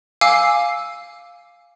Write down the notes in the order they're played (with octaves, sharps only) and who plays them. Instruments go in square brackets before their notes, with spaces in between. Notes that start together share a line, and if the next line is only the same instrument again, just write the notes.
[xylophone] F5 G#5 D6 E6 C7